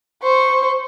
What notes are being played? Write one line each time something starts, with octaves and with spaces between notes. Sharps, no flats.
C5 C#6